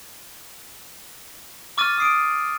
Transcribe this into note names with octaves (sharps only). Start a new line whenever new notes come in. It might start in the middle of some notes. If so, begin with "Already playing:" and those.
C#6 D6 E6 F6 A6 D#7
D#6 C7 D7